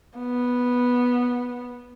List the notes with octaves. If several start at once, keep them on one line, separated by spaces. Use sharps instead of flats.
B3